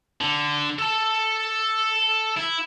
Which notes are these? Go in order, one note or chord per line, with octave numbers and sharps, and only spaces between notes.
D3
A4 A5
E4